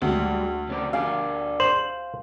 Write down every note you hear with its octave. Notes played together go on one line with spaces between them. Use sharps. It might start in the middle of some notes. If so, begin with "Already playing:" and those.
D2 G3 G#3
C#3 C4 D5
D4 G#4 D5 F5 G#5
C5 F#7